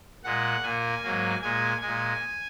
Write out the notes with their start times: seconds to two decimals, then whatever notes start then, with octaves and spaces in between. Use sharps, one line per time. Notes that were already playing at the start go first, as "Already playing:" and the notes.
0.24 A#2 G#3 F#5
0.63 A#2 A#3 G#5
1.03 G#2 F#3 A#3
1.42 A#2 G#3 G#5
1.81 A#2 G#3 G#5